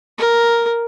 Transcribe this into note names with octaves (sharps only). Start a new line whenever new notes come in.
A#4